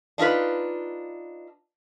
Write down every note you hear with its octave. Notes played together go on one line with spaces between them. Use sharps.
D4 D#4 F4 B4